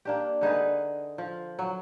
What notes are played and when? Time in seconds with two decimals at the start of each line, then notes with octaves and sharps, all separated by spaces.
0.05 A#3 D4 G4
0.41 D3 D#4 G#4 B4
1.18 F3
1.59 F#3